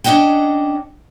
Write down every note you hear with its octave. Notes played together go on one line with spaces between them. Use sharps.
C#4 D4 F4 D#5 F#5 G5